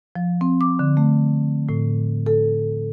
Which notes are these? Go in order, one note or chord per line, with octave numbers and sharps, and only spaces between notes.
F3
C4
D6
D3
A3
A2
A4